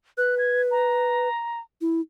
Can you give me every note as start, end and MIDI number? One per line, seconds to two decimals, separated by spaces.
0.18 1.29 71
0.18 0.35 90
0.38 0.62 92
0.71 1.60 82
1.81 2.01 64